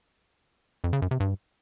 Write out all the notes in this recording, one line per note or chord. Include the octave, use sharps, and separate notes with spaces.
F2
C#3
F#2
C3
G2